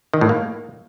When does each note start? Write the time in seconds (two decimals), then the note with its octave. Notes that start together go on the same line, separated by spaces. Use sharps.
0.14 D#3
0.21 A2
0.29 A#3